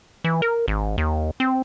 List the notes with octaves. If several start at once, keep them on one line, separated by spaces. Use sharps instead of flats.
E3
A#4
G#1
D#2
C4